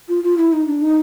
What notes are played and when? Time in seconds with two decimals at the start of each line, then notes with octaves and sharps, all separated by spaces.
0.09 F4
0.23 F4
0.38 E4
0.53 D#4
0.67 D4
0.82 D#4